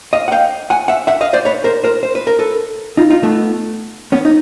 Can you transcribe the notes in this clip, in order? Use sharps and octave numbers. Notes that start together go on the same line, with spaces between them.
D#5 F5
F#5
F5 G5
F#5 G#5
E5 F#5
E5 F#5
D#5 F5
C5 D5
B4 C#5
A#4 C5
A#4 C5
C5
B4
A#4
A4 B4
D#4 F4
D#4 F4
A3 B3
B3 C#4
D#4